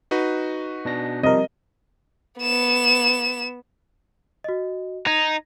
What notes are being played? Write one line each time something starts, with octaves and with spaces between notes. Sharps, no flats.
D#4 F#4 B4
B2 D4 A#6
C3 F3 G3 A#4 D#5
B3 E7
F#4 D#5
D#4 G#6 A#6